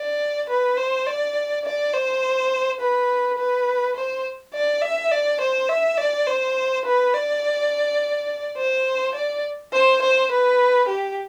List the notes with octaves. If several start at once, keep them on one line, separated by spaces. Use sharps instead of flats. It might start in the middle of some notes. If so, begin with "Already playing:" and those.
Already playing: D5
B4
C5
D5
D5
C5
B4
B4
C5
D5
E5
D5
C5
E5
D5
C5
B4
D5
C5
D5
C5
C5
B4
G4